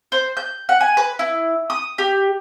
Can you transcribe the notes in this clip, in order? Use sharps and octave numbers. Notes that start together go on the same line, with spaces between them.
C5
G6
F#5
G#5
B4
E4
D#6
G4